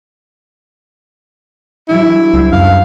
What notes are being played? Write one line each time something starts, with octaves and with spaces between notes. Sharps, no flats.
F#3 G3 D4 E4
C#2 C5 E6
F#2 F5